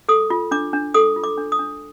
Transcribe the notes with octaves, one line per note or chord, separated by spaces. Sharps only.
A4 D#6
F4
D4 D6
D4
A4 D#6
F4
D6
D4
D#6
D4